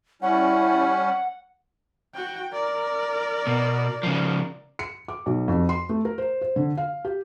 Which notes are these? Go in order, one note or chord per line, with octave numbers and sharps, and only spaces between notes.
G3 C#4 E4 F#5
F#4 G5
A#4 D5
B2
C#3 F3
C#7
D6
B1
F2
C6
A3
A#4
C5
C5
D3
F5
G4